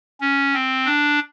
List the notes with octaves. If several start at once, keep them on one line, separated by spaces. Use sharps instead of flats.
C#4
C4
D4